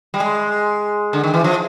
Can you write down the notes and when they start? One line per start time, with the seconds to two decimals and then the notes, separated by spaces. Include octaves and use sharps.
0.14 G3
0.20 G#3
1.13 D3
1.24 D#3
1.34 E3
1.44 F3